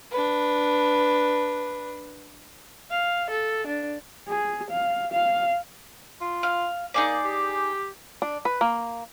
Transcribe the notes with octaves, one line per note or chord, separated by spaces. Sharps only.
D4 B4
F5
A4
D4
G#4
F5
F5
F4
F5
A#3 D#4 G#4 D5
G4
D4
B4
A#3